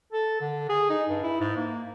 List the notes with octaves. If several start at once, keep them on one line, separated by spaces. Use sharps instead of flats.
A4
D3
G#4
D#4
G2
E4
G#2
A#3